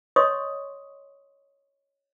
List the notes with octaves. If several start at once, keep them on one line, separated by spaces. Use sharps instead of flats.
C#5 D#5 C6 C#6 D#6